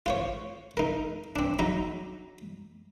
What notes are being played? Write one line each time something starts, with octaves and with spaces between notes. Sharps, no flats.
F4 C5 C#5
D#4 A#4
C4 D4
F#3 D#4 A#5